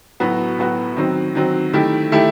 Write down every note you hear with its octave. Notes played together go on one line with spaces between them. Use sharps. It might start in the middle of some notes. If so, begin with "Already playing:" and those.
A2 F#3 B3 F#4
A2 F#3 B3 F#4
D#3 F#3 C4
D#3 F#3 C4
D#3 A3 E4 G4
D#3 A3 E4 G4